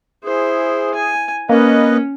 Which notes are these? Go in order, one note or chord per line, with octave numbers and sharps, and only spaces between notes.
E4 G#4 C5
G#5
A#3 C#4 B4 D#5